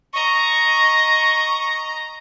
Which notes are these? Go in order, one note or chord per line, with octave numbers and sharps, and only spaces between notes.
D#5 A#5 C#6